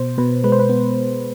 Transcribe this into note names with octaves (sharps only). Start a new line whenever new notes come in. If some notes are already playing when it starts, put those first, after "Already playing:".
Already playing: B2 C5
B2 B4
G#3 B4
C5
B4
B3